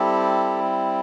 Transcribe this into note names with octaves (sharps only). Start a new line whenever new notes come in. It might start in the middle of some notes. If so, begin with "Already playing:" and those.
Already playing: G3 C4 E4 G4 A4